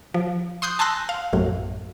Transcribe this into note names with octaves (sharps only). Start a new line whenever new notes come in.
F3
C6 D#6 F#6 G6
G#5 A5 C6 E6 F#6 A#6
F5
A#1 F#2 A2